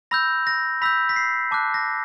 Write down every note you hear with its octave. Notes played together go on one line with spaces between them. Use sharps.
B5 E6 G6 A#6
A#6
B5 E6 G6 B6
B6
C7
A5 D6 F#6
A#6